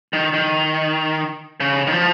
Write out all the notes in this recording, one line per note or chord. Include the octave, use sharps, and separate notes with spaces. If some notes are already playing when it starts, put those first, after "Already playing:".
D#3
D#3
C#3
D#3
F3